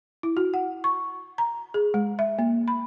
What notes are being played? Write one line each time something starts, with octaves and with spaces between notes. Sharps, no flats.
E4
F#4
F#5
C#6
A#5
G#4
G#3
E5
A#3
B5